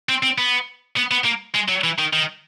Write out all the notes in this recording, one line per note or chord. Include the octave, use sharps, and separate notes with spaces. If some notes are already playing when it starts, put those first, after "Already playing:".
C4
C4
B3
B3
B3
A#3
G#3
F#3
E3
D#3
D#3